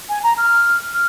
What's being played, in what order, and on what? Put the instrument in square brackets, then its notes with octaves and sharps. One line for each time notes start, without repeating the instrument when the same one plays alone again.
[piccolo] G#5
A#5
F6
F6